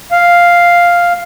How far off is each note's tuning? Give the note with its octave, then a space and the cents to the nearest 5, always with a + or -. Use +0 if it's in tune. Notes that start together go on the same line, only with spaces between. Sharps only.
F5 +0